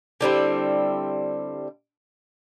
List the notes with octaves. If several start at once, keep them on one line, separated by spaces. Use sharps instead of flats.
D3 G3 C4 E4